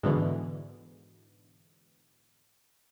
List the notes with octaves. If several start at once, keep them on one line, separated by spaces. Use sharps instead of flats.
G#2 B2 D3 E3